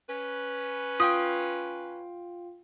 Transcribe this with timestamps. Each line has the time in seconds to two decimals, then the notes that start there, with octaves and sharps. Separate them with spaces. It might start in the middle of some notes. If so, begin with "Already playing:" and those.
0.10 C#4 B4
1.00 F4 F5 G5 D#6